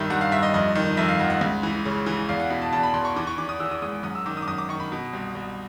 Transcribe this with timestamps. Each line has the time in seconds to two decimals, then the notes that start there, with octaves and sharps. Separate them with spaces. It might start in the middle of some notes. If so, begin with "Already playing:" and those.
Already playing: C2 G2 D#3 E5
0.10 G2 F#5
0.21 F5
0.32 G2 E5
0.43 D#5
0.54 F2 D#5
0.75 D#3
0.97 F2 E5
1.09 F5
1.19 F2 F#5
1.30 F#5
1.41 C#2
1.63 E3
1.85 C#3
2.06 E3
2.29 E2 F5
2.40 F#5
2.50 B2 F#5
2.62 A5
2.73 E2 A5
2.83 B5
2.94 E2 C6
3.05 C#6
3.16 E3 D6
3.27 C#6
3.38 E3 D6
3.49 D#6
3.60 E3 E6
3.71 D#6
3.82 G#2 D#6
4.03 F#2 D#6
4.15 E6
4.26 D#3 D6
4.37 D#6
4.42 D6
4.48 F#2 D#6
4.58 D6
4.69 D#3 C#6
4.80 B5
4.92 B2
5.13 C2
5.35 C2